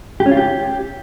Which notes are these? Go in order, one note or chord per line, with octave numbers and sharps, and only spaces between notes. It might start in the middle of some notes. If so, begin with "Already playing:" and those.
G4
C#4
F4
G4